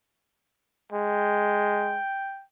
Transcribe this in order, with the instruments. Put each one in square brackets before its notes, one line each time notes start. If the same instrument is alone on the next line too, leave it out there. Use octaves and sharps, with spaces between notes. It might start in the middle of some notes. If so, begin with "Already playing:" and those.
[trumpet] G#3 [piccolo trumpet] G5